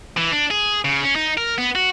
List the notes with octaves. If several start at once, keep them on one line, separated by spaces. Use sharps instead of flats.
E3
D4
G#4
C#3
C#4
D#4
A#4
B3
F#4